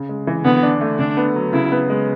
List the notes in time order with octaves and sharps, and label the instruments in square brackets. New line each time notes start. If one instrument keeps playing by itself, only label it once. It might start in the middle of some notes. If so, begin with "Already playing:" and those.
Already playing: [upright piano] C#3
G#3
E3
[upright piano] D3 [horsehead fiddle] B3
[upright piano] D4
A3
[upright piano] D3 [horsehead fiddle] D4
[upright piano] B3
F#3
[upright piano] C#3 [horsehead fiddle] E4
[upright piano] B3
G#3